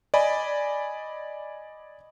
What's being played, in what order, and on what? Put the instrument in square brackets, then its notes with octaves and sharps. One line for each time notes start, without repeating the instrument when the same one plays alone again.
[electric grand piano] D5 D#5 G#5 B5